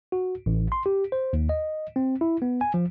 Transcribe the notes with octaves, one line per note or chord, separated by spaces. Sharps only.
F#4
A1
C6
G4
C5
D#2
D#5
C4
E4
B3
G#5
F3